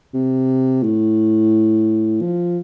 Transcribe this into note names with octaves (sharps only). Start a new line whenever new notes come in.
C3
A2
F3